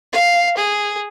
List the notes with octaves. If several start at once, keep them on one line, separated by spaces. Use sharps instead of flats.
F5
G#4